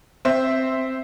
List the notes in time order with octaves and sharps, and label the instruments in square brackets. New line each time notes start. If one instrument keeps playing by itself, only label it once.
[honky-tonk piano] C4 C5 E5